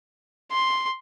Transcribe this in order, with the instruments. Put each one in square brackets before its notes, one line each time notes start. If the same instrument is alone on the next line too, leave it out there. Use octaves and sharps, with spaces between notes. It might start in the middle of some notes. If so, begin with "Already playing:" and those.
[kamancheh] C6